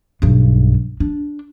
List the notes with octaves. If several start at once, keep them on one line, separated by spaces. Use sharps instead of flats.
B1 G2
D4